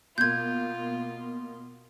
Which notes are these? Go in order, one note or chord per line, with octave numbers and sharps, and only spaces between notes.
B2 A#3 F4 G6 G#6